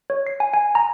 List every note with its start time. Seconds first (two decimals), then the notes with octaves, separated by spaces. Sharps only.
0.10 C#5
0.27 C7
0.40 G#5
0.54 G#5
0.75 A#5